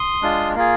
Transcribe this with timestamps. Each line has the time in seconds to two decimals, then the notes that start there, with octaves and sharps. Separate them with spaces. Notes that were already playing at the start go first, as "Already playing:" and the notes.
Already playing: C6 D#6
0.22 G#3 D4 F4
0.55 A#3 F4 G#4